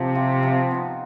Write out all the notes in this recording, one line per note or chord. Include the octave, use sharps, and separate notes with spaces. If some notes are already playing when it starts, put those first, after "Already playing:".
Already playing: C3 F3
C4 F4
F3
B3 D#4